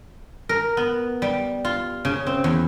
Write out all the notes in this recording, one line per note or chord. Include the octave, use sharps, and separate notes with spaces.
A#4
B3
G3
F4
C#3
C4
E2